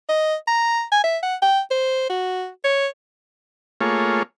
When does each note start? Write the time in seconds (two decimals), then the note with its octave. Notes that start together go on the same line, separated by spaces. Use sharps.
0.09 D#5
0.48 A#5
0.92 G#5
1.04 E5
1.23 F#5
1.42 G5
1.71 C5
2.10 F#4
2.64 C#5
3.81 A3 A#3 F4 G#4 C#5